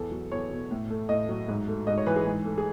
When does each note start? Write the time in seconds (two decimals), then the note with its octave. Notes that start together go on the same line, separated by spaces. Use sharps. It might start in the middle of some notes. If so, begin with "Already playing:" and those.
Already playing: E2 A4
0.12 F#3
0.32 E2 C#5
0.51 B2
0.71 A2
0.90 A3
1.09 A2 D#5
1.29 F#3
1.48 G#2
1.68 A3
1.87 G#2 D#5
1.98 C#5
2.06 E3 B4
2.16 G#4
2.26 G#2
2.45 A3
2.58 G#4